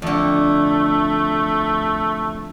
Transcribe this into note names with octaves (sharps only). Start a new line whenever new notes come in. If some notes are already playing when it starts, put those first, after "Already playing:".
F2 D3 A3